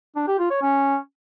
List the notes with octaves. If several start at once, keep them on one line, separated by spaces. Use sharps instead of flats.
D4
G4
F4
C#5
C#4